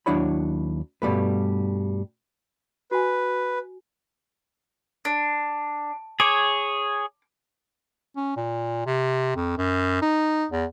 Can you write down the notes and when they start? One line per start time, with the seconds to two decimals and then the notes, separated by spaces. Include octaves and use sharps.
0.06 D#2 F#3 D4 E4 C#5 B5
1.02 G2 B2 G3 A3 B4
2.91 F#4 B4 G#5
5.05 D4
6.20 G#4 C#5 D6
8.16 C#4
8.37 A#2
8.86 C3
9.36 F2
9.58 F#2
10.02 D#4
10.51 E2